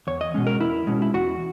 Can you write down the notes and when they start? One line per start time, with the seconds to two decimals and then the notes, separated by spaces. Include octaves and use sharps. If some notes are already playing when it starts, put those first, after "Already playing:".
0.07 E2 C#5
0.21 D#5
0.34 B2 G#3 C#4
0.47 A#4
0.61 E2 E4
0.87 B2 G#3 C#4
1.02 E4
1.14 E2 F#4